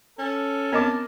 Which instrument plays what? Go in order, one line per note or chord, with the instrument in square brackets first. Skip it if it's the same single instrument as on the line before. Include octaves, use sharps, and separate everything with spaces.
[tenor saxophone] C#4 [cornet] A4
[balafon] B3 C4 [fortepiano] A#4 D#5 D6 [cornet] A5